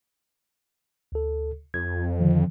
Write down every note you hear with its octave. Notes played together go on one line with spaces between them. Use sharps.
D2 A4
F2 G#6
D3 D#3 F3